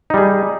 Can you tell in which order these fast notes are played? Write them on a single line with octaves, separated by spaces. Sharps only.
D#4 G3 G#4